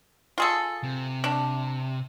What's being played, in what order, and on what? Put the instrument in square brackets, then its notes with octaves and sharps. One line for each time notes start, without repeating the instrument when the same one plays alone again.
[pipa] F4 G#4 A4
[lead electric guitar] C3
[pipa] D4